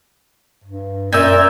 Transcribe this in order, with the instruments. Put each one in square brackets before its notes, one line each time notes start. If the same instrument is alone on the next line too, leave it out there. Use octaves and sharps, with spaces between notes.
[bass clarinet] G2
[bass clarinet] F#2 [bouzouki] A#2 E5 [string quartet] A#4 [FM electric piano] E6 G6 G#6